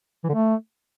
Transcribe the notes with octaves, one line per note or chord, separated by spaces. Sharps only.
E3
D3
A3